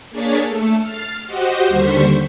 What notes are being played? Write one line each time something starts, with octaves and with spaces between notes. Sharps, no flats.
A#3 D4 G#4 C#5 A6 B6
A3 A4
F6 A6 C7
F#4 G4 C5 D#5 F#5
D#2 D3 G3 C5 C#6 B6